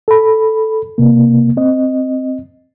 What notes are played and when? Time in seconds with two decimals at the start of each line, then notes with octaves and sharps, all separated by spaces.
0.08 A4 B5
0.98 C3 A#3
1.57 C4 D#5